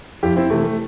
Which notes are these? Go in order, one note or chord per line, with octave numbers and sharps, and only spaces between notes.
F2 E4 G4
C4 E4
C3 E3 A3
A3